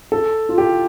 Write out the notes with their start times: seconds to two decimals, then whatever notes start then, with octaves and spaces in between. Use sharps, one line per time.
0.12 A4
0.49 F4
0.58 G4